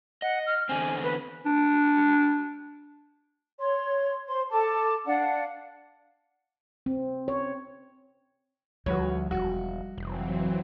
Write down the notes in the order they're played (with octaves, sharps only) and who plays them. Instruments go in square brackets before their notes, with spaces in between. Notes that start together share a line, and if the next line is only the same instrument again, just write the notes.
[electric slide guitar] D#5 [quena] F#5
[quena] F6
[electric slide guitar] E2 D3 C4 [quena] G#5
[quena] B4
[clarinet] D4
[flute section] C#5 C6
C5 C6
A4 A5 D6
D4 F5 F#5
[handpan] C4
C#5
[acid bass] D2 [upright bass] F3 G3 [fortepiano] F#4 B4 C#5
[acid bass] E1 [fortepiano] F#4
[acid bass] F1 [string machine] E3 F#3 C4